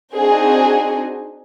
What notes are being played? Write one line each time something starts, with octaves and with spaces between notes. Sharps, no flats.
C4 D4 D#4 F#4 G#4 C5